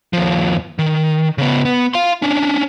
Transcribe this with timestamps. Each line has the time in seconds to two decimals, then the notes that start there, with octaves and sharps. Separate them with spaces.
0.13 D#2 F3
0.79 D#3
1.38 C#3 B3
1.65 B3
1.94 F5 C6
2.22 C#4 D4